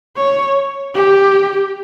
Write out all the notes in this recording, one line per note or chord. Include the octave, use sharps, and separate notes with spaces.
C#5
G4